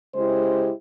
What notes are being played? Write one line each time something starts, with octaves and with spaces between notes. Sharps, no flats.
C#3 G#3 E4 G4 C5